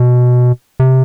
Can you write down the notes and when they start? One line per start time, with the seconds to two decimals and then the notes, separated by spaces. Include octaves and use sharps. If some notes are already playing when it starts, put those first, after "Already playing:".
Already playing: B2
0.80 C3